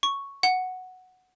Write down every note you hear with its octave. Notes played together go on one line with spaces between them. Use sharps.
C#6
F#5